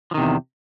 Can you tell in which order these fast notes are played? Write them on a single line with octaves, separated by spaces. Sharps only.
F3 D#3 C3 E2